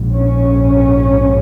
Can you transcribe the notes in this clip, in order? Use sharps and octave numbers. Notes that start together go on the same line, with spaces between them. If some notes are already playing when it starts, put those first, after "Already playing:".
Already playing: A#1 G#2
C#4